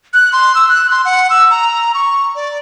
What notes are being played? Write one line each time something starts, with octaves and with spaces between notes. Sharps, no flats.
F#6
C6
E6
F#6
C6
F#5
E6
A#5
C#6
D5